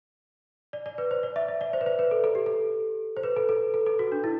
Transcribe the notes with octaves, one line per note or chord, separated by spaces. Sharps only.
D5
D5
B4
C5
D5
E5
E5
D5
C5
B4
C5
B4
A4
A4
G4
A4
C5
B4
A4
A4
A4
A4
F#4
D4
E4